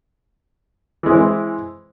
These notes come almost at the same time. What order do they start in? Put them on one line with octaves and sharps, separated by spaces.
E3 G#3 E4 C4